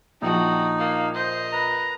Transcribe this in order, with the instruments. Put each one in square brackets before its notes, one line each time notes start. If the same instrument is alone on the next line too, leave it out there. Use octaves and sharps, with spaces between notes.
[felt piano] A#1 F3 [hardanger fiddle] D4 F#4 [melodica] D#4 [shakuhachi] G5
[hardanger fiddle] A#3 [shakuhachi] F5
[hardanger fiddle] A#4 D#5 [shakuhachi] C5
[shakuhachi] B4 [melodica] A#5